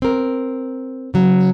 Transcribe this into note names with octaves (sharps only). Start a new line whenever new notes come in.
C4 A#4
C#3 F#3